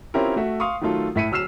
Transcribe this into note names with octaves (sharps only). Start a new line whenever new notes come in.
C4 C#4 E4 F4 G4 A#4
A3 F#4 E5
F5 C6 C#6 D#6
D#3 F#3 A3 F4 A4
A2 E4 B6 C#7 D#7
D1 F#3 E6 F6 C7 E7